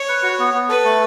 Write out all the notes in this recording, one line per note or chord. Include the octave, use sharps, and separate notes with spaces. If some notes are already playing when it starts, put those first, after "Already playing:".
Already playing: C#5
B4
F#4
B3
B3
A4 B4
A3